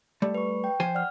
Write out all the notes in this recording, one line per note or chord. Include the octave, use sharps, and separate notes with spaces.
G3 A3
B4 C#6
G5
F3 C5 G#5
D5 F#5 F6